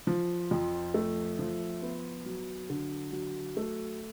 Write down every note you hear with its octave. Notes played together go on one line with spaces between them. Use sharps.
F3
F2
A3
F3
B3
F#3
D3
F#3
A3